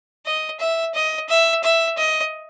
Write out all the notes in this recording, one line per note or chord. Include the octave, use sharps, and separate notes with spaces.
D#5
E5
D#5
E5
E5
D#5